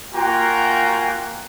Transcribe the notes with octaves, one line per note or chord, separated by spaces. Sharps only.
A#3 F4 F#4 G5 G#5 A#5